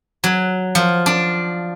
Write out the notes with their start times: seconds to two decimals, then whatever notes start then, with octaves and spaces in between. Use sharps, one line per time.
0.24 F#3
0.75 F3
1.06 D4